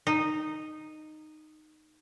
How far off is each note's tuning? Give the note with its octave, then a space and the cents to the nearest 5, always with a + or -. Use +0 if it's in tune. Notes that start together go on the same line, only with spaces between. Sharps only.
D#4 -10